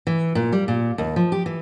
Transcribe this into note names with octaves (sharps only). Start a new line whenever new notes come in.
E3
A#2
G3
A#2
D#2
F3
G4
E3